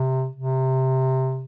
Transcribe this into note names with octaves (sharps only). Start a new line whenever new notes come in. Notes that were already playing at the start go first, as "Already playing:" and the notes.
Already playing: C3
C3